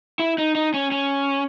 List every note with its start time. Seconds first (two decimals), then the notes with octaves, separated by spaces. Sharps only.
0.19 E4
0.38 D#4
0.55 D#4
0.74 C#4
0.92 C#4